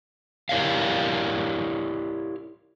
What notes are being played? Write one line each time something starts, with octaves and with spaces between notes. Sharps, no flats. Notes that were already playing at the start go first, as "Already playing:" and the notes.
E4 G4 A#4 C#5 D5 F5